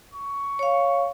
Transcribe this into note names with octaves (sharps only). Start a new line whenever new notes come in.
C#6
C#5 F5